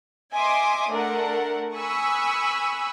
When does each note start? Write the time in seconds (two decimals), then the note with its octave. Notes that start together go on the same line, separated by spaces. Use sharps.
0.33 D#5 E5 G#5 C6 D6 D#6
0.89 A3 D4 A#4 F#5
1.76 G#5 B5 C#6 D#6 E6 F#6